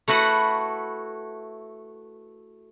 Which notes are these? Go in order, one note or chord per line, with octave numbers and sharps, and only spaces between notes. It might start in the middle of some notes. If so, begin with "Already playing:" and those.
A3 E4 F#4 B4 F#5